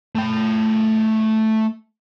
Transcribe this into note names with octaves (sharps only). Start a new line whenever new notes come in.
A3 G5